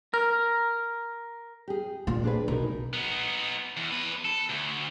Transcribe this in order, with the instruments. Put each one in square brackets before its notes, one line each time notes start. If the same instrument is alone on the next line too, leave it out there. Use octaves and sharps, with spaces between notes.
[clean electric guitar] A#4 [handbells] F6
[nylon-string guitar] G4 G#4
[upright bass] A#2
[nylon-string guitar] D4 G#4 B4
[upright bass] B1 [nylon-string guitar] D#4 A#4
[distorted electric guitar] B3 D#4
E2
E2 B4
A4
D2